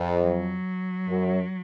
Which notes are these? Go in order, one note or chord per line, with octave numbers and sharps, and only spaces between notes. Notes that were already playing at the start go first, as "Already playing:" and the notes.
Already playing: F2
F#3
F#2